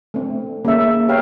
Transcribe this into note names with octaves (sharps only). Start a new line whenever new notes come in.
A3 C4
A#3 C#4 G#4 A#4 E5
B3 G4 A#4 C#5 F5 G5